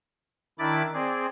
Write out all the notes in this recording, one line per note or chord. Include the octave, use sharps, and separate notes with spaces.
D#3 D4 E4 B5 D6 A6
C4 G#4 D5